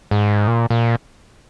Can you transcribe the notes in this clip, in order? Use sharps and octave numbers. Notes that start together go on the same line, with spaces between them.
G#2
A#2
A#2